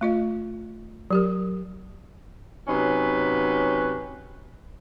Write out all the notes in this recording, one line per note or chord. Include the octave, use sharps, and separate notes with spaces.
A3 F4 D#5
F#3 G4 A#4
C3 F#3 C#4 D#4 B4